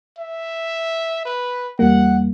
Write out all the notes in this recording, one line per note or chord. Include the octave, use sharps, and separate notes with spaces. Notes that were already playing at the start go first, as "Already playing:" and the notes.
E5
B4
E2 G3 A#3 F#5